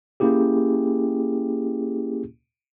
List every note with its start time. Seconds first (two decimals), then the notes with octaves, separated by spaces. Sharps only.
0.20 A#3 C#4 E4 G4 G#4